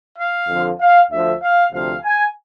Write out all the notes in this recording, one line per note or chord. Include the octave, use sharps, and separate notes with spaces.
F5
F2 D3 F3
F5
D2 D3 F3 E5
F5
D2 C3 F3 F5
G#5